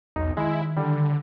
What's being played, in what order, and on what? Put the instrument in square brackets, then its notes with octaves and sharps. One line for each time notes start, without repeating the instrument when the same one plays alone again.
[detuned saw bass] B1 [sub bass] E2 [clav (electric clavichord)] D#4
[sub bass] D#3 [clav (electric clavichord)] G#3 [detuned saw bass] E4
[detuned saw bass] D3 [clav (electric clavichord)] G3